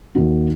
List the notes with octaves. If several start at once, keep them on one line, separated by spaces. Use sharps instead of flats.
D#2 D#3 A#3 D#4 F#4